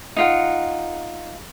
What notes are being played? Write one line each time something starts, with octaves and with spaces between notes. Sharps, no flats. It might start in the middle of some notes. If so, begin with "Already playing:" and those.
D#4 F4 F#5